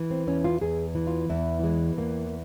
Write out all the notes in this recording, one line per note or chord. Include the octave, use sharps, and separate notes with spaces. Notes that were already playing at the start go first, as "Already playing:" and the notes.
Already playing: E3
C4
E2 C#4
F4
E2 G#4
E3
F4
E2 E4
E3 G#3
E2 A#3